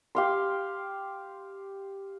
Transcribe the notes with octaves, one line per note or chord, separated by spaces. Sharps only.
G4 F5 C6